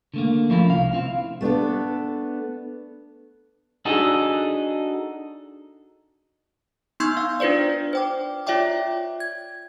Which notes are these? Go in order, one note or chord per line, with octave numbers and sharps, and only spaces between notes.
D3 A3 A#3
F3 C#4 E4 F4 A4 A#4
C2 F5
C4 E4 F5
A3 B3 D4 A4
D4 D#4 F#4 G#4 A4
B3 D#4 C6 C#6 E6 G6
F5
D4 F4 B4 C5 D5
C5 G5 D6
F4 C#5 D5 E5 G5 D6
G#6